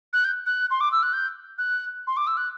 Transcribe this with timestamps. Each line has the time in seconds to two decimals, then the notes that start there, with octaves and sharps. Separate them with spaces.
0.13 F#6
0.24 G6
0.46 F#6
0.71 C6
0.81 D6
0.92 E6
1.03 F#6
1.13 G6
1.58 F#6
2.07 C6
2.17 D6
2.27 E6
2.37 F#6